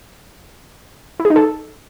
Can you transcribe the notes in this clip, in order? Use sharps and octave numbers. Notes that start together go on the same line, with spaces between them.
E4
G#4
D#4
A4